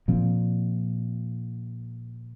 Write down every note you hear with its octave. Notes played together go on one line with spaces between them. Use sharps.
A#2 F3 C4